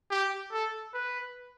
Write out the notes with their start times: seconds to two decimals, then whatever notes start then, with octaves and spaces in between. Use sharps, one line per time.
0.10 G4
0.52 A4
0.94 B4